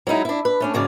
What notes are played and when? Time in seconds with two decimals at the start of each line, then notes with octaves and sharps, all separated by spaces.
0.07 F#3 G#3 D#4 E4
0.25 D4 E4
0.45 B4
0.60 A3 C#4 D4
0.74 D2 G#2 C#3 F#3 D5